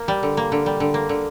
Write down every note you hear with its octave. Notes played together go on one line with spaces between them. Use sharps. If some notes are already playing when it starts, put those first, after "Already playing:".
Already playing: A#3
G3
D3
A#3
D3
G3
D3
A#3
D3